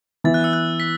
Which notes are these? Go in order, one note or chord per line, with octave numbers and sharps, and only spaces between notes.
E3 B3 E4 A6
F#6
E6
F#6
B6